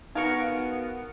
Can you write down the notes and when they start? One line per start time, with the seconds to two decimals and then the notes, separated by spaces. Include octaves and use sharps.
0.15 B3 D#4 F#4 A#4 F5 C#7